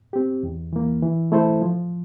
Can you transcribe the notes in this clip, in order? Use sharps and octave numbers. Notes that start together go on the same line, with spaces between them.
C4 G4
E2
E3 A#3
E3
A3 E4 A4 C5
F3